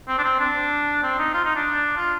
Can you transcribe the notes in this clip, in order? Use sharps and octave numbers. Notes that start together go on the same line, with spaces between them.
C4
D4
C4
D4
C4
D#4
F4
D#4
D4
F4